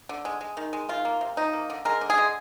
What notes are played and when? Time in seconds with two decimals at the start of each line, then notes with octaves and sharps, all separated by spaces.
0.09 D3
0.25 G#3
0.41 G#3
0.57 D#3
0.73 G#3
0.89 D#3 F4
1.05 A#3
1.21 C3
1.37 F3 D#4
1.53 A#3
1.70 D3
1.85 G#3 A#4
2.01 D3
2.10 G#4
2.18 G#3